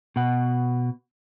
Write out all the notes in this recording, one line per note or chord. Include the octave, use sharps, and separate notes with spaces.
B2 F#5